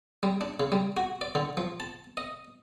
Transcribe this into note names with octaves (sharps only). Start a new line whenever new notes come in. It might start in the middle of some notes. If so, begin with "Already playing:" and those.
G3
D4
C#3
G3
F#4
D5
D3
F3
A5
D#5